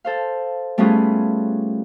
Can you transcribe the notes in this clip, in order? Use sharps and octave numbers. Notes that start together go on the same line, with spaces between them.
A4 C5 F5
G3 A3 B3 C#4 F4 G#4